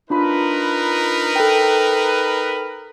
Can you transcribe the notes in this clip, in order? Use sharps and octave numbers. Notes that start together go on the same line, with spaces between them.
D4 D#4 F4 A#4 B4 B5
A4 G5